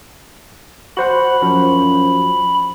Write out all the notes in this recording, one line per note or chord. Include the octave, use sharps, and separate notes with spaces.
F#4 C5 F#5 B5
F#2 F3